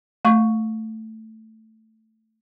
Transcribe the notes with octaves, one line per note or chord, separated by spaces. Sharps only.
A3 C#6